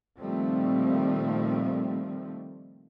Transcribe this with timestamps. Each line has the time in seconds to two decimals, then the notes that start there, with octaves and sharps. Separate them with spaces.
0.18 A#2 D#3 F3 G3 A3 C4